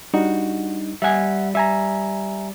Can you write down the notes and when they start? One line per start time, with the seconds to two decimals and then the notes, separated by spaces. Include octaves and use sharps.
0.14 G3 D4 D#4 F#4
1.02 G3 E5 F#5 G#5
1.55 G3 E5 G#5 A#5